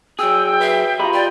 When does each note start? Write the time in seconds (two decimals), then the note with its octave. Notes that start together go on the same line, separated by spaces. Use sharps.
0.19 F#3 G#4 G5 E6
0.60 B4 E5 C7
0.99 F4 G4 D#5 A#5 B5
1.13 D5 G5